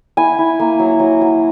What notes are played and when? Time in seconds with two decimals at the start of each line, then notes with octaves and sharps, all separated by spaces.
0.17 E4 G#5
0.39 E4
0.60 A#3
0.79 F#3
1.00 F#3
1.21 F#3